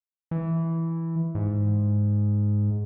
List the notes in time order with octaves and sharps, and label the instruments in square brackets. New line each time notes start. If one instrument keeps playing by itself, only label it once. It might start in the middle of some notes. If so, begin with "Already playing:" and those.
[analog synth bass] E3
G#2